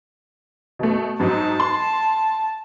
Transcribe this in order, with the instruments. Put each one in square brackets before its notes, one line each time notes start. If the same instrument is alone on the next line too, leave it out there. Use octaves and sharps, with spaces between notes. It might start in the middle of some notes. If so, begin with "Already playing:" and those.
[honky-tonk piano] B2 A3
[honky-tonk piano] G#2 F#3 D#4 [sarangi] A5
[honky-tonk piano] C6